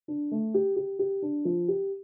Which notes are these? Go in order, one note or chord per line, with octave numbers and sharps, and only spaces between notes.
D4
A3
G4
G4
G4
D4
F3
G4